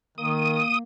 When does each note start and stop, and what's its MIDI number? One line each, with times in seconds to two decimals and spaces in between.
0.18 0.61 51
0.18 0.82 58
0.18 0.79 87